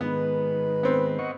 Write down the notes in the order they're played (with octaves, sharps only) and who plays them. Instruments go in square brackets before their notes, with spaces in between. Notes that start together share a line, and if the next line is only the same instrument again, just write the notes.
[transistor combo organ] G#2 D#3 [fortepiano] B3 [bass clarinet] B4
[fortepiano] B3 C4
[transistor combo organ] D#5 F#5 C#6